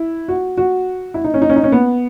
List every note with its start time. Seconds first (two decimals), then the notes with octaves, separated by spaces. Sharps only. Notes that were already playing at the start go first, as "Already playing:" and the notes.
Already playing: E4
0.28 F#4
0.58 F#4
1.14 E4
1.24 D#4
1.34 C#4
1.42 D#4
1.50 C#4
1.56 D#4
1.64 C#4
1.72 B3